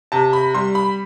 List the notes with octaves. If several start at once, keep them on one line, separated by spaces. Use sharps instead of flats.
C3 A5
B5
G3 C6
B5